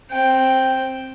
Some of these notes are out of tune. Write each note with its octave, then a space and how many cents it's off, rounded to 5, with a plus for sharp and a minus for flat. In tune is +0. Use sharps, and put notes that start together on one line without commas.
C4 +10 G5 +0